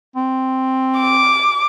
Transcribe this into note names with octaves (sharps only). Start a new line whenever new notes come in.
C4
D6